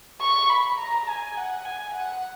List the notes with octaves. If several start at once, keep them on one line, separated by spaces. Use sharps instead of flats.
C#6
B5
A#5
G#5
F#5
G#5
F#5